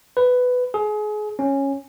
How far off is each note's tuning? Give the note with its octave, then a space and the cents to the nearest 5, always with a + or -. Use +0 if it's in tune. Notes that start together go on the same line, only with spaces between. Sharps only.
B4 +10
G#4 +30
C#4 -10